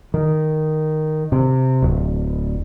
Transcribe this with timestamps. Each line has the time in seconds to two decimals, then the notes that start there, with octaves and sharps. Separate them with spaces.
0.14 D#3
1.32 C3
1.82 D1